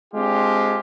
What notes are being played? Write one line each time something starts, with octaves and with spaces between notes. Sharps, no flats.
G#3 C4 D4 F4 G4